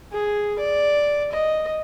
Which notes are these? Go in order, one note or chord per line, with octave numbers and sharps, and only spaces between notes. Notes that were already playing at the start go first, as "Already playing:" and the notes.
G#4
D5
D#5